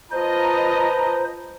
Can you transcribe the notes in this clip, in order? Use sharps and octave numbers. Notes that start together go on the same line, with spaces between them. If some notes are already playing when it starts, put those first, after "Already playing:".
F4 B4 C5 D#5 A5 A#5